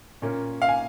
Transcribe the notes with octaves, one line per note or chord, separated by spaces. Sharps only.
A#2 A#3 C#4
F5
G#5